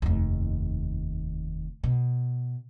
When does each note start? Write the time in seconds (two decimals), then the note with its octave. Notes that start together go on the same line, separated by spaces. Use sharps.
0.02 F1 D#2
1.84 B2